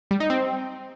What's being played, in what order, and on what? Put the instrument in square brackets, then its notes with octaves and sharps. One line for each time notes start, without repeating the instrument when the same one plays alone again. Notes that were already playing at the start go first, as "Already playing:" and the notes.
[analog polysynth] G3
D#4
C4